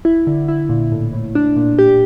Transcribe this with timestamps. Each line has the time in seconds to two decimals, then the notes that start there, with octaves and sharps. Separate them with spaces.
0.05 E4
0.27 D3
0.48 E4
0.69 A#2
0.92 A2
1.13 A2
1.35 D4
1.56 A#2
1.79 G4